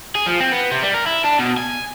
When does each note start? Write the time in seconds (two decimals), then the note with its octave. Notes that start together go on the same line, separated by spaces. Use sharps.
0.15 G#4
0.26 F3
0.40 C4
0.52 B3
0.72 C3
0.83 G3
0.94 A#4
1.06 E4
1.24 D4
1.39 B2
1.57 G#5